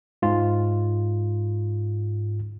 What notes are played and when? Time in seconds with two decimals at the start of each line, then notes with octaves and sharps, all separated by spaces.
0.22 G#2 F4